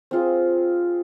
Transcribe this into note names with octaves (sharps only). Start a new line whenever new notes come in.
C4 F4 G#4